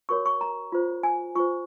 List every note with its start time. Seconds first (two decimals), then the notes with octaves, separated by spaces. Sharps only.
0.09 F#4 A#4 C#5 C#6
0.26 C#6
0.41 A#5
0.72 F4 C5
1.03 G#5
1.35 F4 C5 C#6